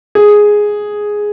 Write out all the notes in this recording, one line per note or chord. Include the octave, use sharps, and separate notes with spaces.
G#4